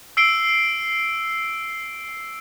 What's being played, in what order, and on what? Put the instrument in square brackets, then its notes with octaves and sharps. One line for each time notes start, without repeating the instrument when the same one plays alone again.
[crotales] E6 C7 D7 G7